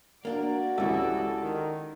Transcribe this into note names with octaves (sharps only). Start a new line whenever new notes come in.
A#3 D4 F#4 A#4 D5
C#2 E3 E4 G4 A4
D#3